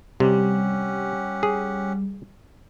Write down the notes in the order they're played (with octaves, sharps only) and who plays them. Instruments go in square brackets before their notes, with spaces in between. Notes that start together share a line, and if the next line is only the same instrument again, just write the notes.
[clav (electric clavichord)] C3 [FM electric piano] G3 [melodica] C#4 G4 F#5
[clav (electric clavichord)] G#4